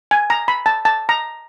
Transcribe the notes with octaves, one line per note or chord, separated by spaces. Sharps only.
G#5
A#5
B5
A5
A5
A#5